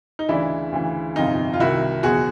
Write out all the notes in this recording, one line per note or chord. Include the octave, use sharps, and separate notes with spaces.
D#4
D2 C#3 E3 D4 E4
D2 C#3 E3
G1 F2 C3 D#4 F4
F4
C2 C3 D#3 E4 F#4
F#1 E2 B2 F#4 G#4